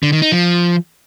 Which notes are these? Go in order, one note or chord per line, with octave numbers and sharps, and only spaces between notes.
D3
D#3
D#4
F3